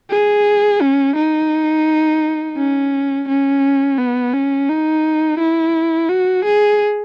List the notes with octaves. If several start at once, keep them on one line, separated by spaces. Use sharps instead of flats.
G#4
C#4
D#4
C#4
C#4
B3
C#4
D#4
E4
F#4
G#4